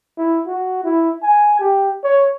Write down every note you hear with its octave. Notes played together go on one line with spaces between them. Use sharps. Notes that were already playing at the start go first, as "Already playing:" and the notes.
E4
F#4
E4
G#5
G4
C#5